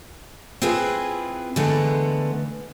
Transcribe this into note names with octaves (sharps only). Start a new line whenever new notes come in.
C4 E4 F4 G#4 B4
D3 E3 G#3 A3 B3